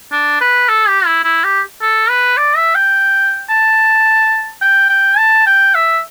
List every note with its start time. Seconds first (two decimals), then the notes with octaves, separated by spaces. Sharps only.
0.12 D4
0.41 B4
0.69 A4
0.88 G4
1.06 E4
1.24 E4
1.44 G4
1.82 A4
2.10 B4
2.37 D5
2.56 E5
2.75 G5
3.49 A5
4.61 G5
4.90 G5
5.18 A5
5.47 G5
5.75 E5